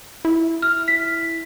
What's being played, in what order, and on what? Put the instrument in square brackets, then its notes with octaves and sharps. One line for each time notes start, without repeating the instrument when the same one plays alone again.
[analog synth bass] E4
[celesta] F6
B6